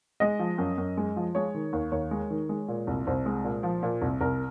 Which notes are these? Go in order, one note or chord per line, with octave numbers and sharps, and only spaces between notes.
G#3 D#5
F3
F#2
F#2
G#3
F3
G#3 C#5
D#3
D#2
D#2 C#5
G#3
D#3
G#3
A#2
C2
C2 C5
G#3
A#2
F3
A#2
C2
C2 A#4